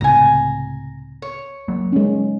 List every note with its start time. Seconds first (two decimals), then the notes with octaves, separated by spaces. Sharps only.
0.01 C#2 A2 C3 G#5 A#5
1.22 C#5
1.68 F#3 A#3
1.92 G#3 C#4